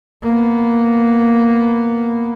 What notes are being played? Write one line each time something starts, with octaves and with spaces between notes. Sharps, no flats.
A#3 B3